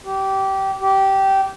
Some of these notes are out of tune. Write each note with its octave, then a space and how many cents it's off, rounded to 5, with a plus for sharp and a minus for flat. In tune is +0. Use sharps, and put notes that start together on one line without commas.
G4 -20
G4 -15